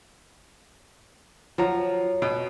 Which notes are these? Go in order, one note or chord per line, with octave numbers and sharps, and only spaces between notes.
F3 F#3 A#5
B2 B4 G5